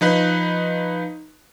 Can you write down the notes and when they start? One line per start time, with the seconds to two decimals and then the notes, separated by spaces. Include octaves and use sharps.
0.01 F3 D#4 B4